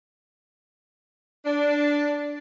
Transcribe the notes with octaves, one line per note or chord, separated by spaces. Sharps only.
D4